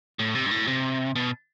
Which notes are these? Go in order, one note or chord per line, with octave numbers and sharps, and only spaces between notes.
A2
C3
G2
A2
C3
B2